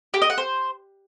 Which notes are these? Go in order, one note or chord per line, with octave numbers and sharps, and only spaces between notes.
G4
D#5
F#5
C5